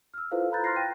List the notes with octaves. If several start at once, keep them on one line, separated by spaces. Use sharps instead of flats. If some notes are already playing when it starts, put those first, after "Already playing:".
E6 F6
E4 F4 A4 B4 C5 F5
A#5 B5 F#6 G6 A6
C6 F6 F#6 A6 A#6 C7
G5 D#7